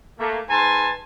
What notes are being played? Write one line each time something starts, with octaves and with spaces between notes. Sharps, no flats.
A3 A#3
G#2 B4 G#5 A5 C6